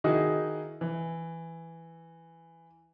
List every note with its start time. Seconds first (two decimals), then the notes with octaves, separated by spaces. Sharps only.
0.04 D#3 D#4 E4 F#4 G#4 D#5
0.81 E3